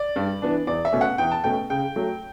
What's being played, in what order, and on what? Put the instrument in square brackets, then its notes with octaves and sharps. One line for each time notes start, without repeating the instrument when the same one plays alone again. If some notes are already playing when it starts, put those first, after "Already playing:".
Already playing: [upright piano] D5
G2
E3 B3 D4
E2 D5
E5
B2 A3 C#4
F#5
E2 G5
A5
B2 A3 C#4 G5
C#3 G5
F#3 A3